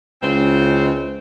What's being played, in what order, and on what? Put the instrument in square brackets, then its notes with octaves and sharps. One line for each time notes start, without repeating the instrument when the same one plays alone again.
[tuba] C#2 [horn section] C#3 E3 C4